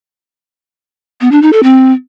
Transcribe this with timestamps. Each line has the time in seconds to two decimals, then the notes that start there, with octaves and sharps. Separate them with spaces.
1.21 B3
1.32 D4
1.42 D#4
1.53 A4
1.63 C4